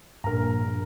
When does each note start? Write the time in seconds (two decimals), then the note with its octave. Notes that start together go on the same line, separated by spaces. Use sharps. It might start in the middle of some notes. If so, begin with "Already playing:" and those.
0.24 A#1 G2 D4 A#4 A#5